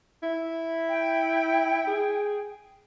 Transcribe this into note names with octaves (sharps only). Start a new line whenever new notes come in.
E4
G5
G#4